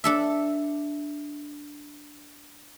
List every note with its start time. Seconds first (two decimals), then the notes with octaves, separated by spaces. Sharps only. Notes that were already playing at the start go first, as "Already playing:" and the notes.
0.04 D4 A4 E5